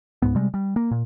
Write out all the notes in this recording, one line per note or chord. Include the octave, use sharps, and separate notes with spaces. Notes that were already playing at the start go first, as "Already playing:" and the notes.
C#2 G#2 B3
C3 G3 G#3
G3
A#3
A#2